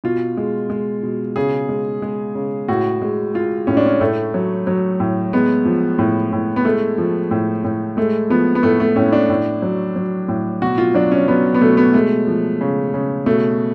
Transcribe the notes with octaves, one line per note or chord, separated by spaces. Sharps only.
B2 F4
G#3
G#3
B2
C#3 G#4
G#3
G#3
C#3
A2 F#4
G#3
G#3 F4
A2 C#4
D4
C#4
A2 A3
F#3
F#3
A2
G#3 B3
F3
A2
A2
B3
G#3 A3
F3
A2
A2
G#3 A3
F3 B3
B3
A2 A3
A3
A2 C#4
D4
A2
F#3
F#3
A2
B2 F#4
F4
F#3 D4
C#4
F#3 B3
B3
B2 A3
B3
G#3 A3
F3
C#3
C#3
B2 A3